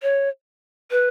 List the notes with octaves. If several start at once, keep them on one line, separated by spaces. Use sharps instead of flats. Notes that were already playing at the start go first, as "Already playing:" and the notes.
C#5
B4